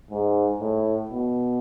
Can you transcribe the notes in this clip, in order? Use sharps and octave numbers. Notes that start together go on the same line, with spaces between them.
G#2
A2
B2